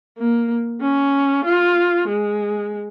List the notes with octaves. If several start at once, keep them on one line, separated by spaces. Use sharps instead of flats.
A#3
C#4
F4
G#3